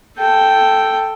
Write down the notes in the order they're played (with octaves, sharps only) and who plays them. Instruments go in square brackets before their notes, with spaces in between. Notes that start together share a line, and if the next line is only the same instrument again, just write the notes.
[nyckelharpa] A4 G5